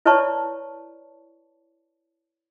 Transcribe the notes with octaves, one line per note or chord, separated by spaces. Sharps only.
E4 B4 C#5 D5 A5 C#6